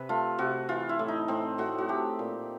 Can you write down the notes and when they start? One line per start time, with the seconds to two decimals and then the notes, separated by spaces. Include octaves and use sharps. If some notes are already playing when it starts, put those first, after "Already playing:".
Already playing: C3 B4
0.09 A3 F4
0.38 C3 F#4
0.69 E3 F4
0.89 E4
0.99 A2
1.08 D#4
1.28 A2 C4
1.58 A2 F#4
1.78 F#4
1.88 A3 G4
2.19 A#2